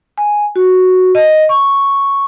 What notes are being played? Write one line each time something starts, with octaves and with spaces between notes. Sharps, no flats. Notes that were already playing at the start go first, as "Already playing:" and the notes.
G#5
F#4
D#5
C#6